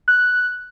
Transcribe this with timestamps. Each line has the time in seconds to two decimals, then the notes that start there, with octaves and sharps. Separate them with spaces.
0.08 F#6